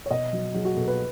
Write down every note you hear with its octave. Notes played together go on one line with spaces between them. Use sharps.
C#5
B2 D#5
F#3
F#3 G#4
F#4
B2 A4
B4